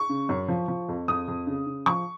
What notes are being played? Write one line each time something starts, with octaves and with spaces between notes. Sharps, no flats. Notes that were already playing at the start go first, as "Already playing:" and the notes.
Already playing: C#6
C#3
F#2
F3
F3
F2
F2 D#6
F2
C#3
C#3
F3 C#6